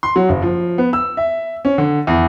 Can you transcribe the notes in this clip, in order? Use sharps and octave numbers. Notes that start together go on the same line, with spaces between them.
C6
F#3
F#1
F3
B3
E6
E5
C#4
D3
E2